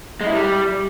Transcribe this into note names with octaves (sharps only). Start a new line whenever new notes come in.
G#3
E4
G3